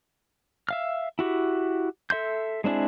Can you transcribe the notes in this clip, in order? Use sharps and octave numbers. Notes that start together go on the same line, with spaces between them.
E5 F5 F6
E4 F#4 G4
A4 E5 C6 G6
G#3 C4 D4 E4 G#4